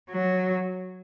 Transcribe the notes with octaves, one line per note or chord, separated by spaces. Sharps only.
F#3